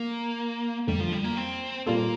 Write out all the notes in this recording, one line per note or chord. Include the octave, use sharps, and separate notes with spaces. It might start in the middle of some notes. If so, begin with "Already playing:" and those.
Already playing: A#3
F2 D3 G3 A3
F3
G3
A#3
C4
A#2 G3 A#3 C4 F4 A4